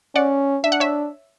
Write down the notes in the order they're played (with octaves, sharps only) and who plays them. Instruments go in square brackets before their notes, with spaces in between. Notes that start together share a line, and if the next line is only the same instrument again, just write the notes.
[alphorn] C#4 [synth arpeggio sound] D5 F#5
[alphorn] D4 [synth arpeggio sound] E5
[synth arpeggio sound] F#5
C#5 E5